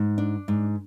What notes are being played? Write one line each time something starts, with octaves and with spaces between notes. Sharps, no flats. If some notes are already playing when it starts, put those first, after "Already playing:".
Already playing: G#2
D4
G#2